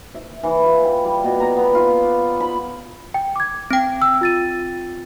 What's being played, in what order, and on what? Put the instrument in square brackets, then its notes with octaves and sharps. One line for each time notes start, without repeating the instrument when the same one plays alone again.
[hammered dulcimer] E5
E3
F4
G5
G3
B2
A#5
B3
F4
D5
B5
[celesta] G5
D6 G#6
[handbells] C4 G5
[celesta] E6
F4 A6 D#7